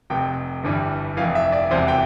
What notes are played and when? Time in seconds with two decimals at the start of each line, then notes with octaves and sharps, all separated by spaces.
0.10 F1 F2 C3 G5
0.63 G1 G2 E3 G3
1.17 F1 F2 E3 F5
1.35 E5
1.52 D5
1.71 E1 E2 C3 E3 C5
1.88 G5